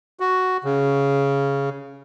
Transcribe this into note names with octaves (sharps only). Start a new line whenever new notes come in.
F#4
C#3